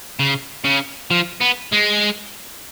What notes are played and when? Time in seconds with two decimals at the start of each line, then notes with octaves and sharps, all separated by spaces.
0.19 C#3
0.65 C#3
1.11 F3
1.41 B3
1.72 G#3